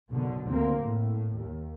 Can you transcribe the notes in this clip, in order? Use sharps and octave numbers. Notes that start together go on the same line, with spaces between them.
F#1 B1 B2 D3
D2 A#3 C4
A2
D#2